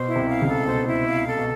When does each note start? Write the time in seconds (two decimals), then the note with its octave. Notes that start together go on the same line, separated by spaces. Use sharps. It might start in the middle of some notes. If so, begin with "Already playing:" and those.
Already playing: B2 C5
0.08 E4
0.16 C2 C3
0.29 F5
0.42 C#2 C#3
0.49 A4
0.67 B2 C5
0.87 E4
1.07 F5
1.26 A4
1.37 B2